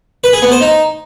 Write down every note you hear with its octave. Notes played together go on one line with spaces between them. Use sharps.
B4
G#4
B3
C5
D#4